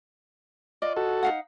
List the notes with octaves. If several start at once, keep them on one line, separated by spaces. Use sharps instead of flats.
F4 D5 D#5
F#4 A4
D#4 F5 F#5